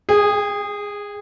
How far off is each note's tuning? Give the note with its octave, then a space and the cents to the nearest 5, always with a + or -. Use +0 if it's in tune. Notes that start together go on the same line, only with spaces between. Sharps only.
G#4 -15 G5 +40